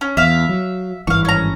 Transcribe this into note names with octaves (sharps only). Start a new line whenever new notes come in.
C#4
E2 E5 F5
F#3
G#1 G2 E3 F5 C#6
C#4 A#5